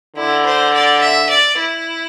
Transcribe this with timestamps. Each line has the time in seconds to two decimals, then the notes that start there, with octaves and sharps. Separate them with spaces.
0.17 D3 E4
0.46 C5
0.73 D5
1.01 E5
1.30 D5
1.58 E4